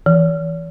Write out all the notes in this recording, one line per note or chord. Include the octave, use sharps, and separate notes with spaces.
E3